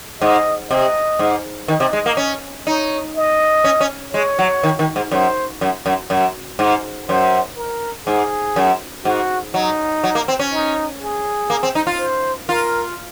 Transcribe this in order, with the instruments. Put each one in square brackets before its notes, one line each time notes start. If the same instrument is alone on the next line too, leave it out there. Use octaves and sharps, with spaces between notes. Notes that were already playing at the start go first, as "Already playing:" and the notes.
[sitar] G#2 [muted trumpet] D#5
[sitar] C3 [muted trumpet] D#5
[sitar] G#2
[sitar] D#3 [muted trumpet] D#5
[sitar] C3
G#3
A#3
C#4
[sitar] D#4 [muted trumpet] C#5
[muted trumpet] D#5
[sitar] C#4
C#4
[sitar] G#3 [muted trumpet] C#5
[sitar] F#3
D#3
D#3
G#2
[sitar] F#2 [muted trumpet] C5
[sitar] F#2
F#2
F#2
G#2
[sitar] F#2 [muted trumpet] C5
[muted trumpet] A#4
[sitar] G#2 [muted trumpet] G#4
[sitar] F#2
[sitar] G#2 [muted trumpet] F#4
[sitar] F#3 [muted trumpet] D#4
[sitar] F#3
A#3
C4
C#4
[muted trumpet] D#4
G#4
[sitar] A#3
C4
D#4
F4
[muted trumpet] C5
[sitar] F4 [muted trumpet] A#4